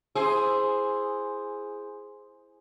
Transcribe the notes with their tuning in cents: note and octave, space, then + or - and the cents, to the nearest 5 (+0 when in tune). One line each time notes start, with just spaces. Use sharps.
E4 +10 G#4 +0 C5 +0